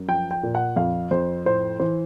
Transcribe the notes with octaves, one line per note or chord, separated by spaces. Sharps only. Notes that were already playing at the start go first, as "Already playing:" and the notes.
Already playing: F#2
F3 G5
G5
A#2
F#5
F2 F5
F2 C5
A2 C5
E3 C5